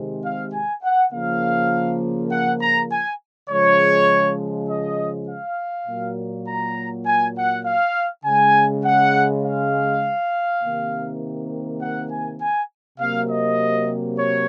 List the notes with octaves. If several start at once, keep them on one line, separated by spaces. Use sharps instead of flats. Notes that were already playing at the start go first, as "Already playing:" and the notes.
Already playing: C3 D#3 G#3
F5
G#5
F#5
C#3 F3 A#3 F5
F#5
A#5
G#5
C#3 F3 G#3 C#5
D#5
F5
A#2 F#3 A#3
A#5
G#5
F#5
F5
C#3 G#3 G#5
F#5
F5
C3 D#3 A#3
F#5
G#5
G#5
C3 F#3 A#3 F5
D#5
C#5